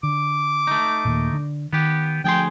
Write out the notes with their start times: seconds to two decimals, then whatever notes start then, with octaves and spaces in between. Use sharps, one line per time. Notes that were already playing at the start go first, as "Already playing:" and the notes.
0.03 D3 D6
0.67 A3 D#4
1.05 D#2 A#2
1.32 D3
1.73 D#3 B3 G4
2.24 D2 F3 G#4 G5 C6